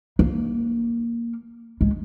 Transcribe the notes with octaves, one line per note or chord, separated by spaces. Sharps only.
A#3
G#3